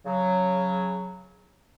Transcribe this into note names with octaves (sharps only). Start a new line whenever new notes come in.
C#3 F#3